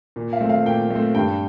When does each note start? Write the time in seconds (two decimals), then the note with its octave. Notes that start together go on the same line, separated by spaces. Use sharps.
0.16 A#2
0.33 F5
0.40 A3 C4
0.49 F5
0.66 A#2 G5
0.90 A3 C4
1.15 G2 G5